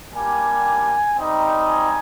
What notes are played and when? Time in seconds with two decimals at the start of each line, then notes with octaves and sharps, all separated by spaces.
0.13 G3 A#3 D4 G4 G#5
1.17 G3 C4 D#4
1.68 G#5